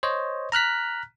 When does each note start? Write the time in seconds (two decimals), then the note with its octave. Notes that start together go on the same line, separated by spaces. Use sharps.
0.03 C5 C#5 D#5
0.52 A#5 F6 F#6 B6